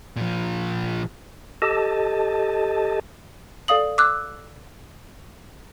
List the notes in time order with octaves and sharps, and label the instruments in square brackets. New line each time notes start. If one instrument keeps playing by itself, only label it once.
[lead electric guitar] A#2 F3
[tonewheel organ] G4 A4 D#5 A5
[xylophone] A4 D5 F5 D#6 F#7
D6 E6 F#6